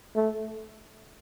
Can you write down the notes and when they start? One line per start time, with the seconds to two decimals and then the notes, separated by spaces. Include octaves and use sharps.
0.16 A3